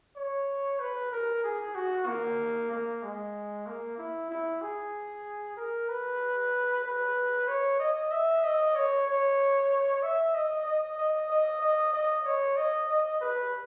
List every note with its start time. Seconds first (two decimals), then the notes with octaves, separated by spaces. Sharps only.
0.17 C#5
0.80 B4
1.12 A#4
1.44 G#4
1.75 F#4
2.07 A#3
2.71 A#3
3.03 G#3
3.67 A#3
3.98 E4
4.30 E4
4.62 G#4
5.57 A#4
5.89 B4
6.84 B4
7.48 C#5
7.79 D#5
8.12 E5
8.44 D#5
8.76 C#5
9.08 C#5
10.03 E5
10.35 D#5
10.66 D#5
10.98 D#5
11.30 D#5
11.62 D#5
11.94 D#5
12.25 C#5
12.57 D#5
12.89 D#5
13.21 B4